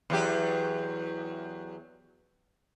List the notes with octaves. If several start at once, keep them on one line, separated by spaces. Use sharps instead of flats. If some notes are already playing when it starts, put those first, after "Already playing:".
E2 F#3 G4